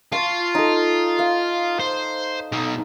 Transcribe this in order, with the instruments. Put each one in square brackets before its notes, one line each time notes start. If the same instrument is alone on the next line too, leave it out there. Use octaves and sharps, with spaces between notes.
[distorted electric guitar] F4 [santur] A5 C#6
[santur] D#4 A4
F5
[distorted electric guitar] C5
B2 D#4